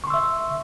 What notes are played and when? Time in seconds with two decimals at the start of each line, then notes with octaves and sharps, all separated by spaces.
0.04 C#6
0.07 C6
0.10 E6
0.14 E5